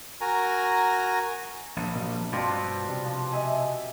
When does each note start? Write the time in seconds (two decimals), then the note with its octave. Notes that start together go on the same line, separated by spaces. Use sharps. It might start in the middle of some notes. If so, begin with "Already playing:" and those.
0.21 F#4 A#4 G#5 A#5
1.76 A#1
1.96 B2 F3 G3
2.32 G2 B2 C4 D4 F4 C6
2.88 C3 G3
3.05 F3
3.32 D#5 E5 G#5